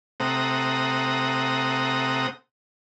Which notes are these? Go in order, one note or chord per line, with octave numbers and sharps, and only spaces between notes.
C3 A3 C4 F#5 A#5 D#6